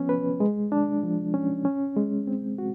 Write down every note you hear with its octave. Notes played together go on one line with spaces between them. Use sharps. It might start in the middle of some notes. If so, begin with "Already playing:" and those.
Already playing: F3 B3 C#4
B4
G#3
D4
F3
C#4
C#4
G#3
C4
F#4